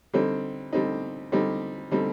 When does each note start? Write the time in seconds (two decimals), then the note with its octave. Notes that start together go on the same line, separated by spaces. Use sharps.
0.13 D3 G3 C4 D#4
0.73 D3 G3 C4 D#4
1.32 D3 G3 C4 D#4
1.91 D3 G3 C4 D#4